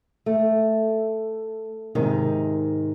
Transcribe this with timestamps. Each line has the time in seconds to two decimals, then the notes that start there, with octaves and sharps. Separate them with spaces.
0.26 A3
1.95 G#2 C3 D#3